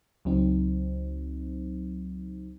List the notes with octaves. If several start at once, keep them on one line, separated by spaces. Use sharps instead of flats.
C#2 F#3 C4 D#4